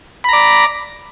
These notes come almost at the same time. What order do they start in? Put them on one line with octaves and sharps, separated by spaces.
B5 A#5 D5